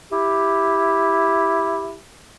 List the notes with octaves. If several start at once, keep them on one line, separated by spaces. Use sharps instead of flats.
E4 G4